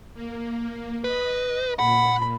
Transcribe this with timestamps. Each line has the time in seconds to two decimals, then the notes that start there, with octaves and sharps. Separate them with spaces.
0.14 A#3
1.04 B4 D#5
1.79 A#2 F#5 B5